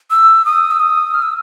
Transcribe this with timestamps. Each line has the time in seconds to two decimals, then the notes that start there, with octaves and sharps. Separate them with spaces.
0.11 E6
0.45 D#6
0.71 E6
0.80 D#6
1.14 F6
1.22 E6